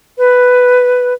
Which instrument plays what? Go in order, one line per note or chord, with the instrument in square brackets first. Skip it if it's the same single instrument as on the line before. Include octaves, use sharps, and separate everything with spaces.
[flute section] B4